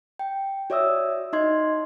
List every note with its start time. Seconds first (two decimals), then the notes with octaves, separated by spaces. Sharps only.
0.19 G5
0.70 F#4 C#5 D5 E5 D#6 E6
1.33 D#4 D#5 C6 G#6